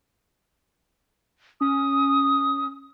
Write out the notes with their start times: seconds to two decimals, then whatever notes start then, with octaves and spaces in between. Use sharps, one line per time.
1.61 C#4 D#6